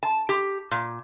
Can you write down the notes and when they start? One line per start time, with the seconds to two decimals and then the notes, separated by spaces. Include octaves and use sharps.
0.03 A5
0.29 G4
0.71 A#2